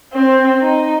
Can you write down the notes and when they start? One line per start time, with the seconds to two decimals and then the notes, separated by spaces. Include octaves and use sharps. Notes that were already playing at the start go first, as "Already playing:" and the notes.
0.13 C4
0.62 D#4